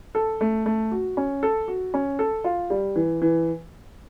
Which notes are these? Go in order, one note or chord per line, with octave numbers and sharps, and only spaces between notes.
A4
A3
A3
F#4
C#4
A4
F#4
C#4
A4
F4
G3
E3
E3